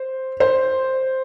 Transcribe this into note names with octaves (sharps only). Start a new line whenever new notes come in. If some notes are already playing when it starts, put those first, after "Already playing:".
Already playing: C5
C5